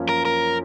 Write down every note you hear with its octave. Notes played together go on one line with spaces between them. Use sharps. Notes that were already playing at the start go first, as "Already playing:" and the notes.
Already playing: F#2 F3 A#3 C#4
A#4
A#4